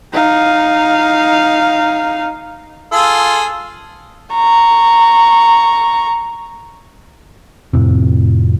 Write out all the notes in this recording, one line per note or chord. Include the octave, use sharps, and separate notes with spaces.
D#4 F5
F4 G#4 A4
A#5 C#6
F2 A2 C3